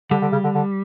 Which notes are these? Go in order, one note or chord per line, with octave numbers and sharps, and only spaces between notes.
D3 G3
D3
C#3
D3
D3